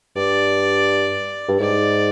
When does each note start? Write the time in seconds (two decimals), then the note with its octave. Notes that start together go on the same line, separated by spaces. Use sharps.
0.16 G2 D5
1.49 G2
1.59 G#2 D5